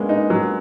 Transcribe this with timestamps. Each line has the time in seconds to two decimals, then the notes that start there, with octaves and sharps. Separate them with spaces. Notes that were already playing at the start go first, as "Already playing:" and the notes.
Already playing: G#3 A#3 B3 C#4 D4
0.09 D#4
0.30 F#3